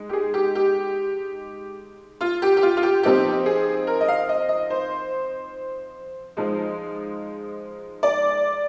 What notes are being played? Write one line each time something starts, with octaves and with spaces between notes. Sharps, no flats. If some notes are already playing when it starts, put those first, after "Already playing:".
Already playing: G#3 D#4
G4
G#4
G4
G4
F4
G4
G4
F4
F4
G4
F3 C4 D#4 G4
G#4
A#4
D#5
F5
D#5
D#5
C5
F3 G#3 D#4
D5